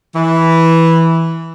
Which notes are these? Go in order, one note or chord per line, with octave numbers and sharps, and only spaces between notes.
E3